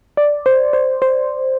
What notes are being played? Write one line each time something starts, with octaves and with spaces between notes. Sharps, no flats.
D5
C5
C5
C5